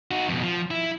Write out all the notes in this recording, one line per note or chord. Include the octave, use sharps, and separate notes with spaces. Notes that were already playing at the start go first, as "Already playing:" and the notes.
D#4 F#4
F2 B2
F3
E4